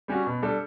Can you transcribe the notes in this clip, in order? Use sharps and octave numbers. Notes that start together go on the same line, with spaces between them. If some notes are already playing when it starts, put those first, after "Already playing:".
G3 C#4 F#4
B2
G3 D4 A4